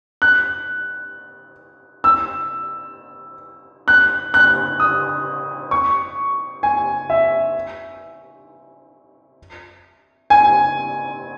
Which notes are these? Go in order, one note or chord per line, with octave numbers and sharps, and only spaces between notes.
F#6
E6
F#6
F#6
D#6
C#6
G#5
E5
G#5